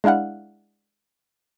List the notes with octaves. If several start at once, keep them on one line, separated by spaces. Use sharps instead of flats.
G#3 D4 E4 F5 F#5